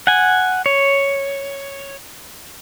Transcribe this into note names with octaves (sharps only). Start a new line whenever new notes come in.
F#5 G#5
C#5